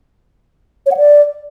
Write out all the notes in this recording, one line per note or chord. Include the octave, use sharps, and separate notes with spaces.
C#5
F#5
D5